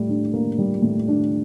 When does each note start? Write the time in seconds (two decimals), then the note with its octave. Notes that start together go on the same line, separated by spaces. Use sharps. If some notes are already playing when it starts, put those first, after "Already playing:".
Already playing: A2 G3
0.09 D4
0.34 A#3
0.58 G3
0.82 A2
1.08 D4